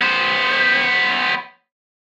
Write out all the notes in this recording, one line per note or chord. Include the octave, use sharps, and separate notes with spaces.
B3 C5